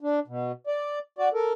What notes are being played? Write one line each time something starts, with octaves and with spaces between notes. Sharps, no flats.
D4
B2
D5
F#4 D5
A4 A#4